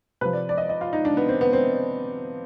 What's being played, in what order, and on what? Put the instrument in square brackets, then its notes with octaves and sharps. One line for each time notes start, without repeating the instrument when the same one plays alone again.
[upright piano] C3 F3 B4
D5
D5
D#5
D#5
F4
D#4
D4
B3
C4
B3
C4